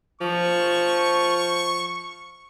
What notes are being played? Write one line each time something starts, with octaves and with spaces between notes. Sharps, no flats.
F3 C#6